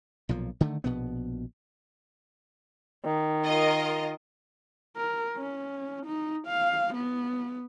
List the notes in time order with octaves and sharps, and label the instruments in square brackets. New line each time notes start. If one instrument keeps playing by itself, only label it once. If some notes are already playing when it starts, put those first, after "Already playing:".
[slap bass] B1 A#2 F3
D3 D#3 A3
A#1 B2 B3
[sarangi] D#3
[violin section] F4 A#4 D#5
[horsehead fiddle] A#4
C#4
D#4
F5
B3